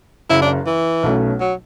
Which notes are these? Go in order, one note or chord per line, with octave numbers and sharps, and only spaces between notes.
F#1 F#2 C#3 E4
D4
E3
B1 B2 A3 C#4
F#3